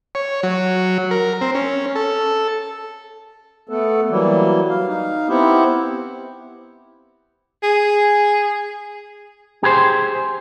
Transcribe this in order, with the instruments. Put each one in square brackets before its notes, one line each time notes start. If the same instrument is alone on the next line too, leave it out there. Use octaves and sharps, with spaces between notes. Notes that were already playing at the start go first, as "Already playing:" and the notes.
[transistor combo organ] C#5
F#3
A#4
C4
C#4
A4
[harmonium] A3 B3 A4
E3 F#3 G3 A#3
F5
D#4 F5
B3 C4 E4 G4
[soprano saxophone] G#4
[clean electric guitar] G4 G#4 B4 C5